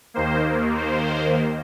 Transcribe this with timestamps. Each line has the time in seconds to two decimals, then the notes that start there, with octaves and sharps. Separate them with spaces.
0.14 D#2 D#3 A#3 C5
0.77 C5